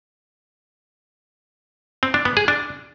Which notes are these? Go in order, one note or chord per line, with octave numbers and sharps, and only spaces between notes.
C4
D4
B3
G#4
D4